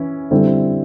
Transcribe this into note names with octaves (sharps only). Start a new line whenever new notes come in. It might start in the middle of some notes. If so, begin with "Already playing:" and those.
Already playing: E3 C#4 E4
D3 G3 C4 E4 A4